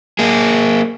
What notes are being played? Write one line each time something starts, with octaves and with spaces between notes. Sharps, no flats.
A#3 G#4